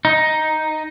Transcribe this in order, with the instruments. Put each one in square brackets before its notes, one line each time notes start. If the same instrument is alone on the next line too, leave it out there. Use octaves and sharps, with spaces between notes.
[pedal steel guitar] D#4